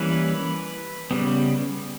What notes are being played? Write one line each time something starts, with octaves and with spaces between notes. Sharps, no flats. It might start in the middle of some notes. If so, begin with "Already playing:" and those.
Already playing: E3 G3 A#3 C#4 B4
C#3 G3 B3